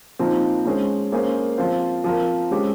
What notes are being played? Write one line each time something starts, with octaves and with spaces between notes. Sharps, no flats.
A#2 F3 C4 D#4
G#3 C#4 G#4 C5
A#3 C#4 G#4 C5
F3 C4 F4 C5
F3 C4 F4 A#4
G#3 C#4 G4 C5